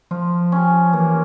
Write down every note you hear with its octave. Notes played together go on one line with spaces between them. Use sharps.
F3 F4
C#4
E3 A#3